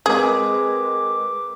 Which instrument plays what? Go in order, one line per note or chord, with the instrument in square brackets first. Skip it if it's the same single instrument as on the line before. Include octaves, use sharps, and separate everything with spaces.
[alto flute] G#3 [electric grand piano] C4 A#4 B4 [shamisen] G#4 [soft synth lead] D6